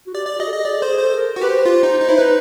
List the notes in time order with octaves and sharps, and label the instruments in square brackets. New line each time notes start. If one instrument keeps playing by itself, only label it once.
[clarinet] F#4
[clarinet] G4 [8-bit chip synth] D5
[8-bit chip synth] D5
[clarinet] G4
[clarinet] F#4 [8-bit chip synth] D#5
[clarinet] A4
[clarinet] G#4 [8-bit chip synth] D#5
[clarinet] G#4 [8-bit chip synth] D5
[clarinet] A4 [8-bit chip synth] C5
[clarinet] G#4
[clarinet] A4 [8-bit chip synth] C5
[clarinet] A#4
[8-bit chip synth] F#4
[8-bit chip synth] G4 [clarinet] B4
[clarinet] C5
[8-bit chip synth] F4
D#4
D#4
[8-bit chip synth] E4 [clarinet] C5
[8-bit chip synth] D#4 [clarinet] B4